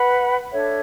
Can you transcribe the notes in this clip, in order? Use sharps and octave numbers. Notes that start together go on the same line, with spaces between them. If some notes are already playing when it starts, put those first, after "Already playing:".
Already playing: B4 F#5 B5
D4 A4 C#5 E5